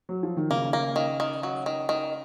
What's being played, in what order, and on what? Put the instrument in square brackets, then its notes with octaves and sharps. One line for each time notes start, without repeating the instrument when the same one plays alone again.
[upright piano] F#3
F3
D#3
[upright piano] C#3 [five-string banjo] A#3
[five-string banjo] A#3
D#3
D#3
F#3
D#3
D#3